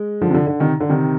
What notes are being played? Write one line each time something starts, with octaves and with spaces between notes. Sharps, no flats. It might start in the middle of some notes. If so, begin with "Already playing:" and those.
Already playing: G#3
D3 F3
C3
D3
D3
C3 D#3
D3
C3 D#3